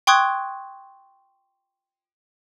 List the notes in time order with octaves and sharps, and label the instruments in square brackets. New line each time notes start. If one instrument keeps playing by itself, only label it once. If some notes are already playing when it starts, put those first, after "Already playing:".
[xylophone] G5 C6 C#6 D#6 F#6 G#6